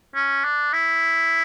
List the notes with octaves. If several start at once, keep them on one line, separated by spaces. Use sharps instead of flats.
C#4
D4
E4